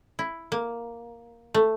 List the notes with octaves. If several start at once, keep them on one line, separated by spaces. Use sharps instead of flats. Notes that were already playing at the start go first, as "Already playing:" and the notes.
E4
A#3
A3